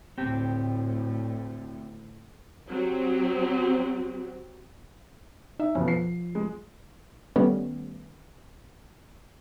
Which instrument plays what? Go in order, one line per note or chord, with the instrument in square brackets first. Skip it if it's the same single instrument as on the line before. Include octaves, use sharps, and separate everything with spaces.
[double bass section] D2 A2 [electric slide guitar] C4 G4
[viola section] F#3 C4 G4
[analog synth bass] D#4 [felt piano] E5
[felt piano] F2 B2 [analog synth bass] C#4
[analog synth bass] F3 [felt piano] C7
[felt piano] G#3
[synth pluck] D#3 G3 A3 B3 C#4